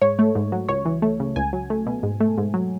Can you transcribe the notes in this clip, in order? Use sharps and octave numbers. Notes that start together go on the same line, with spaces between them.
G#2 C#5
A3
G#2
F#3
C#2 C#5
E3
A3
C#3
C#2 G#5
F#3
A3
B2
G#2
A3
G#2
F#3